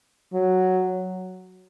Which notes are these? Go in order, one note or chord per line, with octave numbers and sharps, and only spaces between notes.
F#3